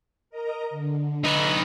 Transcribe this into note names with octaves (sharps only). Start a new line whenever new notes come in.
A#4 D#5 A#5
D3
D#4 B4